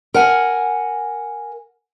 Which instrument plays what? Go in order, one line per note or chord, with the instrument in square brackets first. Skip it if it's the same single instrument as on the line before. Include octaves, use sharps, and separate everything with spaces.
[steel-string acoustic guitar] A#4 F#5 G#5